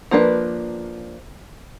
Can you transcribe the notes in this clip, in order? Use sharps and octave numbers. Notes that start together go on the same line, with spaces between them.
F3 A#3 D4 B4